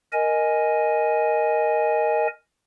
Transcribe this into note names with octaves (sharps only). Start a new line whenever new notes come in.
A#4 D#5 G#5